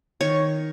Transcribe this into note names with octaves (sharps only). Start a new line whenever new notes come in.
D#3 C#5